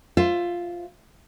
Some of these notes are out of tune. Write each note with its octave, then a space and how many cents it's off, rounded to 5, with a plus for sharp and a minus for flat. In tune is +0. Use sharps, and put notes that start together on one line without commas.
F4 +0 C5 +0 E5 +20